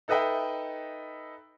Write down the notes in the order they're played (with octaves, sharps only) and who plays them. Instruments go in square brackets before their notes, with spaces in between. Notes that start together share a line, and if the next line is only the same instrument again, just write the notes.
[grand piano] D#4 A4 B4 D#5 E5 G5